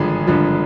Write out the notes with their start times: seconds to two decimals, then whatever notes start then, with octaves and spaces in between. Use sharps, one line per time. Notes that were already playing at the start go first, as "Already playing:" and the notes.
Already playing: G#1 G2 D3 F3 G#4
0.27 G#1 G2 D3 F3